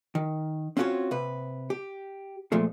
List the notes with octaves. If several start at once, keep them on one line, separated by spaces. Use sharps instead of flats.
D#3
C4 C#4 F4 F#4 A#4 C#5
C3 B4
G4
A#2 F3 G#3 A3 F4